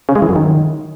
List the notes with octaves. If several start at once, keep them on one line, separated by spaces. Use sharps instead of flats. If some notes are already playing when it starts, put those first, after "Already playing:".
C#3
G#3
E3
F#2
D#3